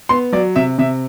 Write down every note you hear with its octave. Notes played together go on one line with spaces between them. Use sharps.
B3 C6
F#3 D5
C3 E5
C3 E5